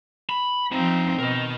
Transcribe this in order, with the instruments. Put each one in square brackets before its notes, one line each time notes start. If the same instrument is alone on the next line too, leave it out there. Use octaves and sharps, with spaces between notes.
[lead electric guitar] B5
[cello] F3 C4 [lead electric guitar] D#4 E5
[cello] B2 [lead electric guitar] A#4 D#5